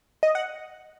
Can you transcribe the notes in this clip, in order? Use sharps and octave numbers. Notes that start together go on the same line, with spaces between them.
D#5
F#5